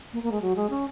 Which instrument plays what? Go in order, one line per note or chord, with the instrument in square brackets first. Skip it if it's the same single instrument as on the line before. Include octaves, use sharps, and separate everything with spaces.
[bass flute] A#3
A#3
G#3
F#3
G#3
C#4